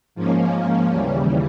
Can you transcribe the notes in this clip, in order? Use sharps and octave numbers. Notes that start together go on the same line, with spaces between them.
G#2 F3 A#3 C#4
D#2 C#3 E3 G3